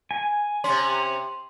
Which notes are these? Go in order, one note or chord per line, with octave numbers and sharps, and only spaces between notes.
G#5
C3 C#4 C6